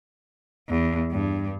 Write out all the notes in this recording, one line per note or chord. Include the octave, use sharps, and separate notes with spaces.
E2
G2